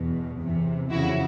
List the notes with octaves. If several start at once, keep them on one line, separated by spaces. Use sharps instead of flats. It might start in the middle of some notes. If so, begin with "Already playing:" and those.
Already playing: E2 B2
E2 C3 E3
F2 C#3 F3 E4 F#4